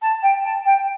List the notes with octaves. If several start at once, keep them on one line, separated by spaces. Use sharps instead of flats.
A5
G5
A5
G5